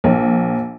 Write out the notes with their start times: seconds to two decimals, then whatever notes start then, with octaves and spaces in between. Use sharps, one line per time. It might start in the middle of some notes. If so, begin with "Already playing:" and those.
0.04 A#1